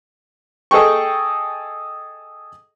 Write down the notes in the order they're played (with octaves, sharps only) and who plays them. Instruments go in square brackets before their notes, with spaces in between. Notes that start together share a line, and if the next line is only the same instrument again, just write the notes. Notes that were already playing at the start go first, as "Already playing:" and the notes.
[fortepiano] G#4 A4 D#5 G5 C#6